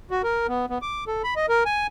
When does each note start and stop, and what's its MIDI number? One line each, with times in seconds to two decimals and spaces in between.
0.11 0.22 66
0.23 0.47 70
0.48 0.66 59
0.70 0.78 59
0.82 1.04 86
1.07 1.22 69
1.24 1.34 83
1.36 1.46 75
1.49 1.64 70
1.66 1.87 80